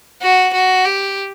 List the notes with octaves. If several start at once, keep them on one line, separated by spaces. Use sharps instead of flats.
F#4
F#4
G4